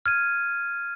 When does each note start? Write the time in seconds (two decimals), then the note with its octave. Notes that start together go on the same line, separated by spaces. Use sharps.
0.06 F6 G#6 D#7